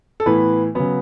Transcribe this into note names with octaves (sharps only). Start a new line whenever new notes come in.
A4
A2 E3 B3 B4
C#3 F#3 B3 B4